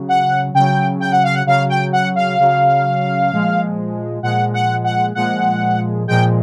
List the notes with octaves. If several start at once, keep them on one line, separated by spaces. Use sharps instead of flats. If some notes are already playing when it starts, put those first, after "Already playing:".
Already playing: C#3 F#3
F#5
C#3 F#3 G5
G5
F#5
F5
F#5
C#3 F#3 F5
G5
F#5
F5
C#3 F#3
A#2 F3 G#3
A#2 F3 G#3 F#5
F#5
F#5
A#2 F3 G#3 F#5
A#2 F3 G#3 G5